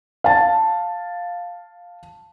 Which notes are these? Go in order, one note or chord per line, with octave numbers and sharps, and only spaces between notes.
F5 A5